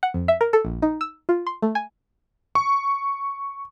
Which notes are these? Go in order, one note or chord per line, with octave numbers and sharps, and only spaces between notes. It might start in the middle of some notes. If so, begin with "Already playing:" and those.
F#5
F2
E5
A#4
A4
A#1
D#4
E6
F4
C6
A3
G#5
C#6